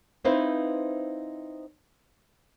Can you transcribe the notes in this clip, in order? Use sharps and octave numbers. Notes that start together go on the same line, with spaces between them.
C4 D#4 E4 B4 C5 F5